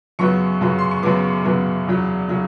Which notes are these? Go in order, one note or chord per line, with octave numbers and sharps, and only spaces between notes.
F#2 C#3 F#3 B3 C#6
F#2 C#3 F#3 B3
C6
C#6
F#2 C#3 F#3 B3 D6
F#2 C#3 F#3 B3
E2 C#3 F#3
C#3 F#3